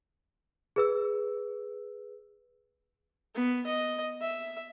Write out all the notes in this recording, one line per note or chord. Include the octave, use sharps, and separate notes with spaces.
G#4 B4 E6
B3
D#5
E5